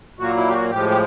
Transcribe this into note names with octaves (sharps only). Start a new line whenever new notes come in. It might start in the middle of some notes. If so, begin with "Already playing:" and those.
A#2 F#3 A#3 F#4
E4
G4
F#4
A2 F3 G#3 G4
G4